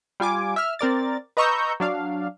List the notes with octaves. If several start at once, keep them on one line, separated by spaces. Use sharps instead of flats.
G3 F4 G#5 D6
E5 F6
C4 A#4 D5 A6
B4 D#5 A#5 C#6 E6 G6
F#3 D4 F5